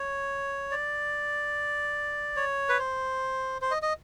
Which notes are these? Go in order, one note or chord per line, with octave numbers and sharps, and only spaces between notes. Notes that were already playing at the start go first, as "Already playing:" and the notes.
Already playing: C#5
D5
C#5
B4
C5
C5
D#5
D#5